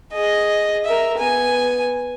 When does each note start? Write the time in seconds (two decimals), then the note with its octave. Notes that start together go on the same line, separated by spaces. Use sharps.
0.13 G#4 D#5
0.85 A#4 E5
1.18 B3 G#5